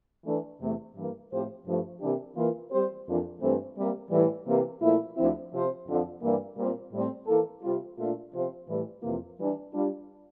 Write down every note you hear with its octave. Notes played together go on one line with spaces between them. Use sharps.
E3 A3 D4
E2 C3 E3 A3
G2 E3 A#3
A2 F3 C4 G4 C5
G2 F3 A3
C3 E3 A#3 D4 G4
E3 A#3 F4
G3 C4 G4 C5
F2 E3 A#3 D4 F4
G2 E3 A3 C4
C3 G3 A#3
A2 E3 G3
C3 E3 A#3
A#2 F3 A3 E4
D2 D3 F3 C4 E4
C3 F3 C4 F4 C5
F2 D3 F3
G2 E3 G3 A#3
A#2 G3 C4
A2 G3 C4
E3 A#3 E4 A4
C3 G3 C4 F4
A#2 A3 D4 F4 A#4
C3 F3 C4 F4 C5
A2 E3 G3
F2 C3 E3 A#3 F4
E3 G3 D4
G3 D4 F4